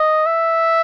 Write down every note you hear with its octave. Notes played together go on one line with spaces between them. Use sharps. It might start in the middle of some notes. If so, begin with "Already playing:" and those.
Already playing: D#5
E5